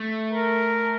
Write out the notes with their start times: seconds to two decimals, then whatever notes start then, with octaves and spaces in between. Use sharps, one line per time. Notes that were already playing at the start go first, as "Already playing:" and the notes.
Already playing: A3
0.33 A#4